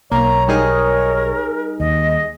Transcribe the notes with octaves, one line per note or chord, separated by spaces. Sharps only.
B1 A#3 C#5 A#5
G3 D#4 G#4 A#4
D#2 D#5